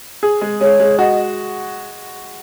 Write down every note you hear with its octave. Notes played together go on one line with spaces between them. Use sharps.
G#4
G#3
G#3 C#5
G#3
F#4 D#5